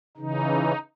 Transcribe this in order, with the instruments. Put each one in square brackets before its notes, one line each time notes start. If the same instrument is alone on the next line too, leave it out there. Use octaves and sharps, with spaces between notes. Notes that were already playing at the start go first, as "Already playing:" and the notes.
[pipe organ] C#3 E3 D#4